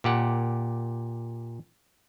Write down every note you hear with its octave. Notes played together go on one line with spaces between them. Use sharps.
A#2 G4 F#5